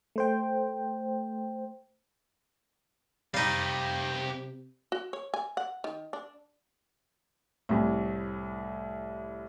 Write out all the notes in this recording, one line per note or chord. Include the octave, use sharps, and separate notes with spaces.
A3 C5 G5
C3 G3 D#4 G4 F5
F#4
C#5
G#5
F#5
D#3
D4
C2 A2